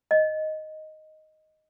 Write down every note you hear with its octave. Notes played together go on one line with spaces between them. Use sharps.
D#5